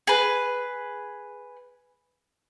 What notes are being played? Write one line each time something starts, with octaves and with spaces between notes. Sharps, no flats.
G#4 B4